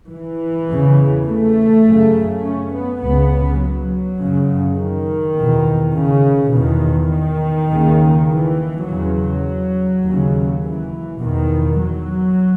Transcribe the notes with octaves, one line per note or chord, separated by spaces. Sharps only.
E3
E2 C#3
A3
F#2 C#3
C#4
B3
C#2 C#3 B3
F#3
F#2 C#3
D#3
E2 B2
C#3
E2 B2 D#3
D#3
D#2 C#3
E3
E2 C#3 F#3
D#2 C#3
E3
E2 B2 D#3
F#3